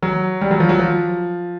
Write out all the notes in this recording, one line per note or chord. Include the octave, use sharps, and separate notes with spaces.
F#3
G3
F#3
F3
F#3
F3